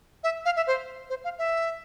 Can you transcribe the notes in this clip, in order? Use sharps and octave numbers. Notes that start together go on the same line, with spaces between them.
E5
F5
E5
C5
C5
F5
E5